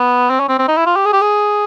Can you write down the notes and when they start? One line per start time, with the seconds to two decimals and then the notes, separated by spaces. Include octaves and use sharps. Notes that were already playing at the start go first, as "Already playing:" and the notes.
Already playing: B3
0.30 C4
0.40 C#4
0.48 C4
0.59 C4
0.68 D#4
0.77 E4
0.86 F4
0.96 G4
1.06 G#4
1.13 G4
1.21 G#4